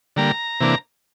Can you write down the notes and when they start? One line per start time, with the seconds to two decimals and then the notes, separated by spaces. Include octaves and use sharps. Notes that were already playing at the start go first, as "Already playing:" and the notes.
0.16 D3 G3 A#3 A#5
0.60 C3 E3 A#3 D4